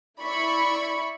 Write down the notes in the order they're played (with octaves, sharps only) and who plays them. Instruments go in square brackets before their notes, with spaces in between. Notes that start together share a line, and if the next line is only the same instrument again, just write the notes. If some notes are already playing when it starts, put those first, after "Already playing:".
[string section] E4 D5 B5 C#6